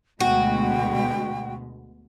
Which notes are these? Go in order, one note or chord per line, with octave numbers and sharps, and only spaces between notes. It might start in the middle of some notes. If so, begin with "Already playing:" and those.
D2 B2 G#3 F#4 G5